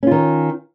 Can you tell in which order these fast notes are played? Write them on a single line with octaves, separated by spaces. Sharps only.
C#4 F4 D#3